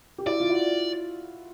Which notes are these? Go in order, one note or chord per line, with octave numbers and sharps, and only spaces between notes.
G4
E4 F#4 D5
F4
E4 F#4